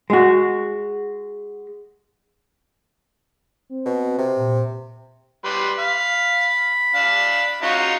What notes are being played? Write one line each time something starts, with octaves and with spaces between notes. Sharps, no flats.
G#3 F#4
C4
B2
C3
A#2
G3 B4 C6
F5 B5
D4 F5
C#4 D#4 F4 F#4